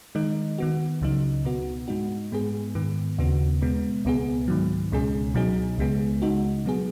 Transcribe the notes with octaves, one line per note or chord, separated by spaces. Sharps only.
D#3 G#3 D#4
D#3 B3 F#4
C#2 C#3 F#3 D#4
B2 B3 F#4
G#2 G#3 D#4 F#4
G#2 G#3 B3 G#4
G#2 D#3 B3
D#2 C#3 B3 F#4
B2 G#3 B3
C#2 B2 B3 G#4
G#2 D#3 F#3
C#2 B2 G#3 C#4 G#4
B2 F#3 D#4 G#4
C#2 C#3 G#3 B3 G#4
C#3 G#3 D#4 F#4
B2 F#3 B3 G#4